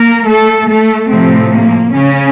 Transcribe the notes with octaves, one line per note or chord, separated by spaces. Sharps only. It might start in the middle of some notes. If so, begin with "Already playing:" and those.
Already playing: A#3 A#4
A3 A4
A3 A4
A2 C3 F3 A3 C4
A#3
C#3 C#4